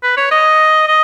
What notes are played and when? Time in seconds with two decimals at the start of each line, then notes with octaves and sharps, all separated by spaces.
0.03 B4
0.17 C#5
0.32 D#5
0.88 D#5